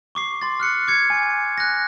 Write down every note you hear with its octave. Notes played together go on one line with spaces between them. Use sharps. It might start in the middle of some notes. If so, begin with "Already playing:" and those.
C#6 D6 C7
C6 A6
F6 F#6 C#7
D6 G#6 C#7
G#5
F#6 A#6